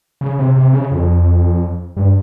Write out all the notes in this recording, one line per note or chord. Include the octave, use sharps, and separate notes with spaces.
C#3
C3
C3
C#3
F2
G2